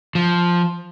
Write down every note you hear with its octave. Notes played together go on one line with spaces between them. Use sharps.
F3